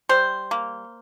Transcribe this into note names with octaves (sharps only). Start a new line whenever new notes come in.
G3 C5
A#3